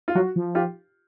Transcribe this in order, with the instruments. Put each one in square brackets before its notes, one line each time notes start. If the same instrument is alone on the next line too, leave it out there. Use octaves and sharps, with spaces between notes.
[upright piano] F4
[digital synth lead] F#3 [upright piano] F#4
[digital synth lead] F3
[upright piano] F4 G4